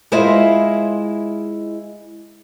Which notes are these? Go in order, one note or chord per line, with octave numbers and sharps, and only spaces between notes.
G#3 E4 F4 C5 D#5 E5